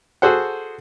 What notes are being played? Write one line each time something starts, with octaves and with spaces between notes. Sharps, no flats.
F#4 G#4 A4 C5 F#5